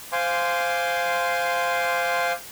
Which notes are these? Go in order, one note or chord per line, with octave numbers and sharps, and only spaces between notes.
C5 F5 G#5 C6 D6